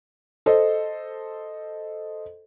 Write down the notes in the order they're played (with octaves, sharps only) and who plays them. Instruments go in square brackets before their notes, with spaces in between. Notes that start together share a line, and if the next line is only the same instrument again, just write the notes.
[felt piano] A4 C5 D#5